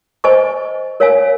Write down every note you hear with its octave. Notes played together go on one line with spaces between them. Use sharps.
C5 D#5 G#5 C#6
A#4 C#5 F5 G#5